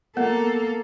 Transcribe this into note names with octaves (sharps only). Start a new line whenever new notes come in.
A#3 B3 A4 A#4